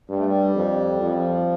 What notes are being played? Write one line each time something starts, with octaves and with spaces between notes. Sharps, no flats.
G2 G3
A3
G3
F2
F2 F3